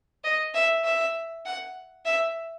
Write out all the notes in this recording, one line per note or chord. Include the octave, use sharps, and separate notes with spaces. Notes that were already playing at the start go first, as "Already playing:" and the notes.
D#5
E5
E5
F#5
E5